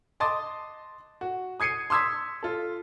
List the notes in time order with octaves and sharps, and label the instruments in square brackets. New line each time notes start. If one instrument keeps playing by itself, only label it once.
[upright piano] D#5 A5 C6 D6 D#6 A6
F#4
D#6 G#6 C7 C#7 D#7
C6 D#6 E6 G#6 B6
F4 A4